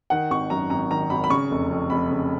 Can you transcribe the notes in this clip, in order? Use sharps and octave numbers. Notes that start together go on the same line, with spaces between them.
D#3 F#5
G#1 C#6
F#2 A#5
G#1 A#5
D#3 A#5
G#1 B5
B5
C#3 C#6
F1
F2
F1 B5
C#3